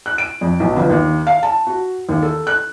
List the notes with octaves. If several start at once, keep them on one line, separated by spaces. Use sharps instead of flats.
F#6
D7
F2
B1
G1
D#2
F5
A5
F#4
D#2
A4
F#6